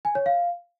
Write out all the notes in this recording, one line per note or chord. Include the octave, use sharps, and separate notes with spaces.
G#5
C#5
F5